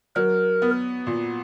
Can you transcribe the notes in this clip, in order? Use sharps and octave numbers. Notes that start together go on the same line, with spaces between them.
F#3 A#4
B3
A#2